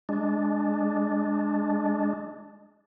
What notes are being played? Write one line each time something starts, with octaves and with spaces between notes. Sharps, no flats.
G#3 D4